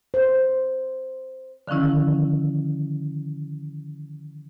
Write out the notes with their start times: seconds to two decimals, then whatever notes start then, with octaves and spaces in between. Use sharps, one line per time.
0.14 C5
1.67 D3 D#3 F3 C#4 E4